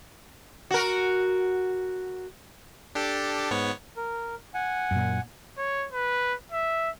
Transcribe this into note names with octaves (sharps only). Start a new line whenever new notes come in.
F#4 A#4
D4 G4 A4
G#2 B3 C#5
A#4
F#5 G#5
F#2 A#2
C#5
B4
E5